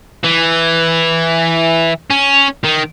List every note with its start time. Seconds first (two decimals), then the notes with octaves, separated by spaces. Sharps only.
0.24 E3
2.10 C#4
2.64 D#3